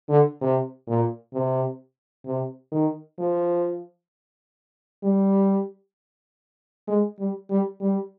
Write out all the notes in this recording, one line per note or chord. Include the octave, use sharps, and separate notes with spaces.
D3
C3
A#2
C3
C3
D#3
F3
G3
G#3
G3
G3
G3